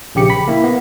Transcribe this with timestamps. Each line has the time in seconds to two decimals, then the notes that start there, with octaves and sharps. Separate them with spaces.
0.15 A#1 C#3 G4 C#7
0.30 B5 B6
0.48 A#3 E4
0.64 B3